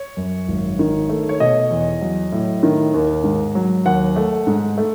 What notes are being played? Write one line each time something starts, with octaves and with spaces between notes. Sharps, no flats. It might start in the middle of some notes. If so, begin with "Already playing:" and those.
Already playing: C#5
F#2
G#1
D#3
A3
C#5
B2 D#5
E2
F#3
A2
D#3
D#2
G#2
F#3
D#2 F#5
A3
G#2
A3